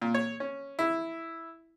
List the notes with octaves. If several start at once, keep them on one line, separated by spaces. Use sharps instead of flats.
A#2
C#5
C#4
E4